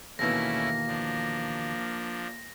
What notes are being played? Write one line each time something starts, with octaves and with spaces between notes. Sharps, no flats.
D#2 B2 E3 A3 A#3 C#4 E4 A#6
F3 D4